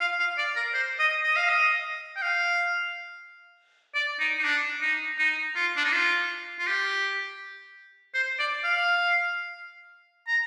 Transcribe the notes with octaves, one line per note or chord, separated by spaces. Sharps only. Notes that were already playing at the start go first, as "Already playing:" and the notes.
F5
F5
D5
A#4
C5
D#5
D#5
F5
D#5
G5
F5
D5
D#4
D#4
D4
D#4
D#4
F4
D4
D#4
F4
F4
G4
C5
D5
F5
A#5